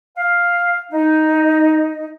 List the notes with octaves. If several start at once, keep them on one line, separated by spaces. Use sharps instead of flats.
F5
D#4